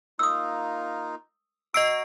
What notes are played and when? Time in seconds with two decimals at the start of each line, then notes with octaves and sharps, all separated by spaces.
0.19 A#3 D#4 F4 D#6 E6
1.74 F#4 D#5 A#5 E6 C7 D7